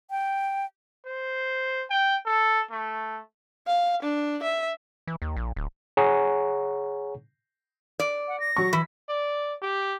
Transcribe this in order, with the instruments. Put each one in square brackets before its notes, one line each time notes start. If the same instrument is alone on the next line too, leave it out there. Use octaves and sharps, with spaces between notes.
[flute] G5
[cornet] C5
G5
A4
A3
[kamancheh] F5
D4
E5
[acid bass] E3
D#2
A#1
D1
[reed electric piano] G#4 C#5 F#5 G#5 A#5 C#6
[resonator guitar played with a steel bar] D5
[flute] F#5
A#6
[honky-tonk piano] F#3 C#6
[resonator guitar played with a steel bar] E3 [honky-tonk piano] B6
[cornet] D5
G4